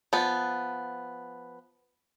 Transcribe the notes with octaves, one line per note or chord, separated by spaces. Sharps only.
F3 B3